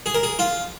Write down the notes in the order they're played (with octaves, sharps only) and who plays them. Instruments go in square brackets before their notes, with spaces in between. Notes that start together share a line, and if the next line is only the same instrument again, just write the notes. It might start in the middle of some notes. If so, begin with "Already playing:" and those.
[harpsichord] G#4
A#4
G#4
F4